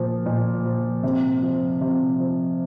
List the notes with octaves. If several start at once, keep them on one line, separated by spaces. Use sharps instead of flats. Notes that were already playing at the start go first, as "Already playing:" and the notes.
Already playing: A#2 F3
A#2
F3
C3
F3
C3
F3